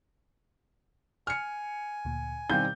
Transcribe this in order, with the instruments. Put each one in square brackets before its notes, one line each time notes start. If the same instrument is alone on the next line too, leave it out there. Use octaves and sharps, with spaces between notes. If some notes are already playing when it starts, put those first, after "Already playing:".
[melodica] G#5 [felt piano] F6 C#7
[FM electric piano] D2 A#2
[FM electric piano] B2 F5 [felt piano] D#3 G3 C4 [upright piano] G6